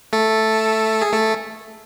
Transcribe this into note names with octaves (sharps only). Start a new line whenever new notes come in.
A3 A4
G#4
A3 A4